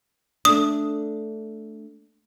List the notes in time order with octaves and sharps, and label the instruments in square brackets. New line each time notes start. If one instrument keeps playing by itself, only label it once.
[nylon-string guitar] A3 D4 [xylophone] D#6